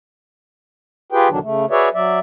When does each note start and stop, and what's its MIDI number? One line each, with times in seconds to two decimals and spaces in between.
1.12 1.28 65
1.12 1.28 67
1.12 1.28 68
1.12 1.28 71
1.12 1.28 79
1.29 1.39 40
1.29 1.39 47
1.29 1.39 50
1.29 1.39 51
1.29 1.39 54
1.29 1.39 62
1.43 1.65 49
1.43 1.65 57
1.70 1.89 66
1.70 1.89 68
1.70 1.89 71
1.70 1.89 73
1.70 1.89 74
1.70 1.89 76
1.94 2.19 54
1.94 2.19 74
1.94 2.19 76